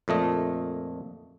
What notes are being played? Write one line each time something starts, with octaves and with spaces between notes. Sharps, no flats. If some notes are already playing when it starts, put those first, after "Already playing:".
F2 A#2 A3 D#5